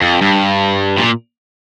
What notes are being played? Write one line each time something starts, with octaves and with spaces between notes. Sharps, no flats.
F2
G2
A#2